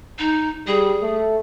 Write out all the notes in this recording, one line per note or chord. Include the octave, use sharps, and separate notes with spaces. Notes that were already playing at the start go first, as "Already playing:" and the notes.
D#4
G3 G#4
A3